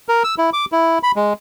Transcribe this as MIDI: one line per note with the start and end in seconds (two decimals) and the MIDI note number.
0.09 0.23 70
0.24 0.35 88
0.38 0.50 64
0.53 0.65 86
0.72 0.99 64
1.03 1.12 83
1.16 1.33 56